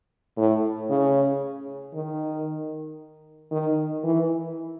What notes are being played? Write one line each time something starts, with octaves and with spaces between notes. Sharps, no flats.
A2
C#3
D#3
D#3
E3